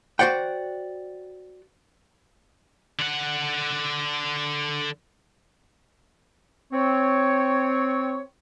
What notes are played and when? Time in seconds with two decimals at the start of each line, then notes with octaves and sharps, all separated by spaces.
0.19 F#4 C5 D5 F#5 G5
2.99 D3 F#5
6.72 C4 C#5